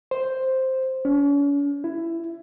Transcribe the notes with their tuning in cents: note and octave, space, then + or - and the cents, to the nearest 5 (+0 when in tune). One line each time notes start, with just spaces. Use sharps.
C5 +0
C#4 +40
E4 +20